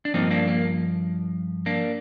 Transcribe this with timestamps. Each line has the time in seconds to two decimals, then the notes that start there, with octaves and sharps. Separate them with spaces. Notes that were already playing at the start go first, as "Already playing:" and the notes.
0.05 D4
0.14 G2 F3 A#3 C4 D#4
0.31 A#3 D4
0.47 A#3
1.66 A#3 D4